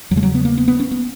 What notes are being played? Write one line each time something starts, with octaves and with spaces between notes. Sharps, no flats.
E2 F#3
C#3 G#3
F#3
B3
A#3
B3
B3
C#4
B3